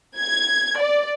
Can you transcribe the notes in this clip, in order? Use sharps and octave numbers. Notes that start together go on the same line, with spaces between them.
G#6
D5